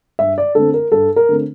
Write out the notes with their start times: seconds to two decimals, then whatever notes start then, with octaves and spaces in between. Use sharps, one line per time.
0.19 G2 E5
0.38 D5
0.55 D3 A3 C4 A4
0.74 A#4
0.92 G2 A4
1.16 A#4
1.29 D3 A3 C4